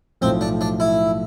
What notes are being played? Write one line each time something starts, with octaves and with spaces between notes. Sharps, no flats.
B1 A2 F3 C4
D4
D4
E4